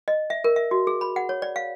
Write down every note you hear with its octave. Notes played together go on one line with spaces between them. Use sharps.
D#5
E5
A#4
E5
F#4
G#4
B5
F#5
C#5
D5
F5